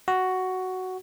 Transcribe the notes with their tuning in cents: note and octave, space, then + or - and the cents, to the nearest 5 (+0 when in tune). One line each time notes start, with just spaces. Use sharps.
F#4 +5